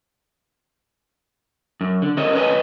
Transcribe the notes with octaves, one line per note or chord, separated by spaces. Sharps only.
F#2
D3
C#4 A4 A#4 C#5 D#5
B4 C#5 D#5 F5 G5 G#5